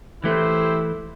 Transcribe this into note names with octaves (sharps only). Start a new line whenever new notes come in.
E3 A3 E4 G4 C5